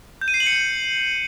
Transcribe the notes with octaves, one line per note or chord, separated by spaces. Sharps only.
G6
D#7
C7
F#7
C#7